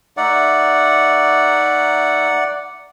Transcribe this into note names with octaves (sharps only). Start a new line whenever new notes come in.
A3 D#4 D5 E5 F#5